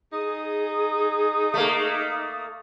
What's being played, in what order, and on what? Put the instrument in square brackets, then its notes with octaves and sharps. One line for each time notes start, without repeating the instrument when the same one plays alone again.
[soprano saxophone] D#4 [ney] G#4 [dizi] D#6
[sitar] A3 A#3